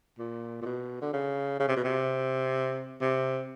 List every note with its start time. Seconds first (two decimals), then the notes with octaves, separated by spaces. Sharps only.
0.19 A#2
0.62 A#2
0.66 B2
1.02 D3
1.13 C#3
1.60 C#3
1.68 C3
1.77 B2
1.84 C3
3.01 C3